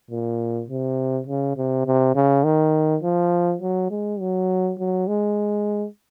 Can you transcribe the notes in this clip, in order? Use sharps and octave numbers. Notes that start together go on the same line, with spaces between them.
A#2
C3
C#3
C3
C3
C#3
D#3
F3
F#3
G#3
F#3
F#3
G#3